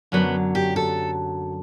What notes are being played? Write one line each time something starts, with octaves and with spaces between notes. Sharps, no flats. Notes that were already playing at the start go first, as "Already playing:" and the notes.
F#2 D3 F#3 B3
G4
A4